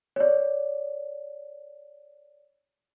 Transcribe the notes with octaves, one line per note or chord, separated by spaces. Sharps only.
C#5 D5